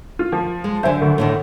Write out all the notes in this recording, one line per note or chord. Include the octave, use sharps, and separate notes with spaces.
F4
F3
G#3
D3 F#3 C5 E5 G#5
D2
A2 D3 D#3